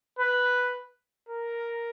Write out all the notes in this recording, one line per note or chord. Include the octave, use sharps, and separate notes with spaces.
B4
A#4